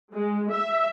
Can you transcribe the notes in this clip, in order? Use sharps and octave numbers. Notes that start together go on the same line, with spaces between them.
G#3
E5